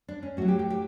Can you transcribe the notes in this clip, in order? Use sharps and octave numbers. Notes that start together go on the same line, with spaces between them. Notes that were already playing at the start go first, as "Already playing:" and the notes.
D4
C#4
A2 F#3 F#4
G4
G4
G4